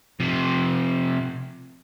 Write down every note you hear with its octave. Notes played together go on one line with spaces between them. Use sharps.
C3 F3